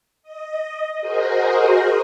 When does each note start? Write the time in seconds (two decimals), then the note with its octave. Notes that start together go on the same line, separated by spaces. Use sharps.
0.23 D#5
1.00 F#4 G#4 A#4 C5 D#5